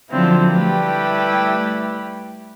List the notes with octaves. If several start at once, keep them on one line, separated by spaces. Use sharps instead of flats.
D3 F3 F#3 C4 E4 F4
G3 A3 E4 G4 B4